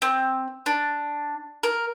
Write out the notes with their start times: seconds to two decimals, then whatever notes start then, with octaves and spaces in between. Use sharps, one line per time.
0.02 C4
0.66 D4
1.63 A#4